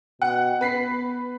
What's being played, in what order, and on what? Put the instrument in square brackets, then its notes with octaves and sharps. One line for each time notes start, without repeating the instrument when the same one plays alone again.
[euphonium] B2 [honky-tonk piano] F#5
[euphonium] B3 [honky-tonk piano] B4 B6 C7